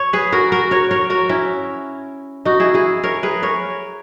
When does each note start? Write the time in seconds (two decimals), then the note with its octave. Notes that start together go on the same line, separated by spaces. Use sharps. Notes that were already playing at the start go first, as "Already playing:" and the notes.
Already playing: C#5
0.13 G#4 B4
0.32 F#4 A#4
0.52 F#4 A#4
0.71 A#4 C#5
0.91 A#4 C#5
1.10 F#4 A#4
1.29 C#4 E4
2.45 D#4 F#4
2.60 E4 G#4
2.74 E4 G#4
3.04 A#4 C#5
3.23 G#4 B4
3.43 A#4 C#5